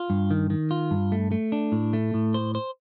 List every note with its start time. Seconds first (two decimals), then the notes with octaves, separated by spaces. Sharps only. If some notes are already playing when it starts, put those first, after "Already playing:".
Already playing: F4
0.10 G2
0.31 D#3
0.50 D#3
0.71 F4
0.91 G2
1.12 A3
1.32 A3
1.52 D4
1.72 A2
1.93 A3
2.14 A2
2.34 C5
2.55 C5